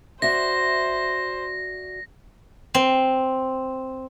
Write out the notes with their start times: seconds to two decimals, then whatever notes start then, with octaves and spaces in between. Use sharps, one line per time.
0.22 F#4 C5 D5 E5 A#6
2.75 C4